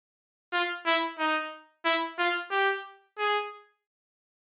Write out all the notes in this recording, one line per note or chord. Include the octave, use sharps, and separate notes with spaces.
F4
E4
D#4
E4
F4
G4
G#4